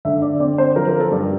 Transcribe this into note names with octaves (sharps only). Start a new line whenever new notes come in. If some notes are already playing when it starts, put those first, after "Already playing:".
D3 E5
D5
C4 D5
C5
F3 A#4
A#4
A4
G2